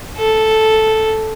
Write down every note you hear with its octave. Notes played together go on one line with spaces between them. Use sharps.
A4